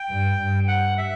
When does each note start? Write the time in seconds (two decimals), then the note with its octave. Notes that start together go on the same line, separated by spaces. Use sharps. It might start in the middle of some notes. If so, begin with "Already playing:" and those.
Already playing: G5
0.09 G2
0.38 G2
0.68 F#5
0.98 E5